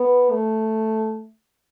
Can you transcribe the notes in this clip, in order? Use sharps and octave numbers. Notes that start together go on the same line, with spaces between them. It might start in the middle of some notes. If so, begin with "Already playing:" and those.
Already playing: B3
A3